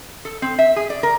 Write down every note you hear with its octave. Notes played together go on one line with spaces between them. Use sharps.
A4
C4
E5
G#4
D5
A#4